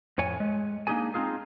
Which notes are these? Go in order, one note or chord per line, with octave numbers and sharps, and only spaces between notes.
F2 A2 C#5 G#5
G#3
A#3 D4 D#4 G4 G#4 G#5
C4 C#4 D#4 F4 G#4